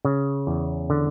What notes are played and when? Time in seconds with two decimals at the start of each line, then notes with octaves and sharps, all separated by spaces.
0.05 C#3
0.47 E2
0.90 D3